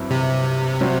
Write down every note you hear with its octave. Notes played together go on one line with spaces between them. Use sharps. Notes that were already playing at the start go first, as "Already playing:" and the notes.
Already playing: G2 F#3 C4 E4
C3
F#3 C4 F#4 C5